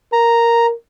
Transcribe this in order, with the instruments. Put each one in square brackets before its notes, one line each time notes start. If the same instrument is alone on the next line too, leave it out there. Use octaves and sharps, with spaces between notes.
[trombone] A#4 [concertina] A#5